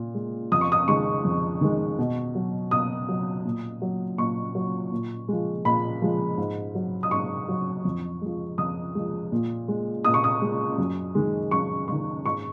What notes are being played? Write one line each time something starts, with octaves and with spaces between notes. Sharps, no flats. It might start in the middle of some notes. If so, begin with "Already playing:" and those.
Already playing: A#2
G#3
F2 D#6
C#6
D#6
D#3 G#3 C#6
F2
D#3 G#3
B2
F#3
B2 D#6
F#3
A#2
F#3
A#2 C#6
F#3
A#2
F3 G#3
A#2 B5
F3 G#3
G#2
F#3
D#6
G#2 C#6
F#3
F2
F3 G#3
F2 D#6
F3 G#3
A#2
G#3
A#2 D#6
C#6
D#6
G#3
F#2
D#3 G#3
F#2 C#6
D#3 G#3 C#6
G#2 C#6